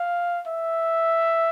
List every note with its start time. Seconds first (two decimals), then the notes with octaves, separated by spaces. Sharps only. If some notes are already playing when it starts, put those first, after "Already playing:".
Already playing: F5
0.47 E5